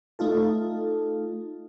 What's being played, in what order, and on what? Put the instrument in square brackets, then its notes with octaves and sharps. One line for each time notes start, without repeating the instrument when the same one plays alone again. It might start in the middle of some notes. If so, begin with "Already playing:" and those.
[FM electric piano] A3 D#4 F4 A4